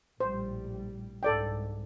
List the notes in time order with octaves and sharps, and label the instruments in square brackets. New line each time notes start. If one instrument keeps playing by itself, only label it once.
[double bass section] A#1 A2 G3 [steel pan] C5
[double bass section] C2 G#2 [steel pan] A4 D5 G5